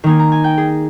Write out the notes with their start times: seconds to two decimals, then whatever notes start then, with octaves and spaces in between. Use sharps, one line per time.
0.04 D#3 A#3 D#4 G#5
0.19 A#5
0.32 G#5
0.44 G5
0.58 G#4